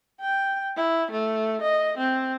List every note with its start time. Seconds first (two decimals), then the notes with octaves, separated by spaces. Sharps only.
0.21 G5
0.77 E4
1.11 A3
1.62 D#5
1.98 C4